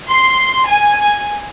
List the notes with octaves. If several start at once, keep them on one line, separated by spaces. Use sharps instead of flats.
C6
G#5